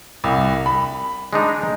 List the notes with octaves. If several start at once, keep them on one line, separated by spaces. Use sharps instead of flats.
C2
B5
G#3 D4 D#4